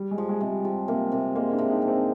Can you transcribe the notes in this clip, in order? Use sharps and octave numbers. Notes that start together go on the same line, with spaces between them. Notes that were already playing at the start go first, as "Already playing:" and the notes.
Already playing: G3
G#3
F3
G#3
C3 G#3
G3
F3 G3
C3 A#3
C3 A#3
G#3 A#3
D4
C3
D#4
C3
C4